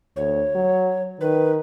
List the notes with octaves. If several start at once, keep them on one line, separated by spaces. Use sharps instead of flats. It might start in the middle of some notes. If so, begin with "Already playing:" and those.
D2 C#5
F#3
D#3 B4